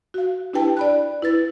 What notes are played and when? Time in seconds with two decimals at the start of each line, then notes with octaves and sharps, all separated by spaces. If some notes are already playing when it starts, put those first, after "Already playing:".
0.14 F#4 F5
0.53 D4 E4 G4 B4 G5 A5
0.77 D5 B5 F#6
1.22 E4 B4 A6